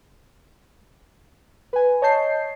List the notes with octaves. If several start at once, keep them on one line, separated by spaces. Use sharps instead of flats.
B4 G#5
C#5 D#5 A5 G6 C7